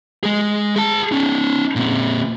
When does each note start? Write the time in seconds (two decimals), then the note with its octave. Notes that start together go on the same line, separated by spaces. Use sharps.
0.23 G#3 G#4
0.76 G#4 A5
1.12 C#4 D#4
1.76 A#2 C4